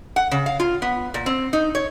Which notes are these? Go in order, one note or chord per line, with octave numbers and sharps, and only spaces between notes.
F#5
C#3
F5
F4
B3
A#2
C4
D#4
C#5